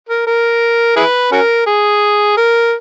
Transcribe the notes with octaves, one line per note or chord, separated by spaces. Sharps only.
A#4
A#4
E4 G#4 B4
C#4 F#4 A#4
G#4
A#4